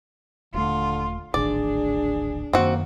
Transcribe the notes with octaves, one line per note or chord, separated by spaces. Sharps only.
D#1 D3 A3 F4
D1 G#1 D2 D4 G#4 D5
F#2 D#3 A#3 C4 F#4